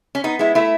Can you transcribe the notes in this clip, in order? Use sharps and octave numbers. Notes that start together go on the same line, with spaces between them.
C#4
B3 D#4
G#3 E4
A3 E4